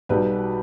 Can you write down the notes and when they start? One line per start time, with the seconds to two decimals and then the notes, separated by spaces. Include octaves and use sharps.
0.09 B1 B2 G3 G4 B4